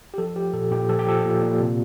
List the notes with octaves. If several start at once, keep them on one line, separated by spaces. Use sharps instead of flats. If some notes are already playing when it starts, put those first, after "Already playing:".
G4
F3 A4
F3 G4
A#2 A4
A#2 G4
F3 A4
G4
F3 A4
A#2
A#2
C3